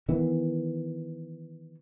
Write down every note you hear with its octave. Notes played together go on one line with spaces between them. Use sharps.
D#3 E3 B3